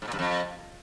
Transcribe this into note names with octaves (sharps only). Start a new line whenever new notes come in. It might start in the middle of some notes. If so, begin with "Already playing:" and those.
G#2
A#2
G2
F2